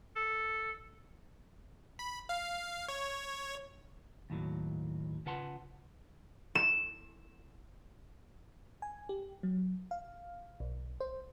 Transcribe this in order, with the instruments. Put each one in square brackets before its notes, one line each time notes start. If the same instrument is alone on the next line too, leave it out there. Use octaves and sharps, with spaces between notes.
[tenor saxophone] A4
[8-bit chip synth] B5
F5
C#5
[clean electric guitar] D#2 A2 F#3
C#3 F4 B4 F#5 A5 C6
[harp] E7
[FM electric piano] G#5
G4
F#3
F5
B1
C5